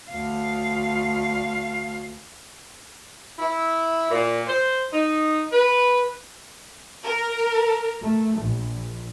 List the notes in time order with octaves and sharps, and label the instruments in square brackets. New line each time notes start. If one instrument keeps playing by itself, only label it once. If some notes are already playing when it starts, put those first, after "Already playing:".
[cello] D2 F5
[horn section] E4
A#2
C5
D#4
B4
[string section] A#4
A3
A#1